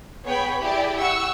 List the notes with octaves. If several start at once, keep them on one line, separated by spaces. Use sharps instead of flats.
B3 G#4 C#5 G5 B5
E4 G4 G#4 D5
F#5 C#6 E6